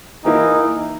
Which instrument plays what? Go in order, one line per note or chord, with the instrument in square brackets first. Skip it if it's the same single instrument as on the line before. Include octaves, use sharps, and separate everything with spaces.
[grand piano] E3 A#3 E4 [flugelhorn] D#4